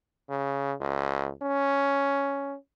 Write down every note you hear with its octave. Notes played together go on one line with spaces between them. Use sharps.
C#3
C#2
C#4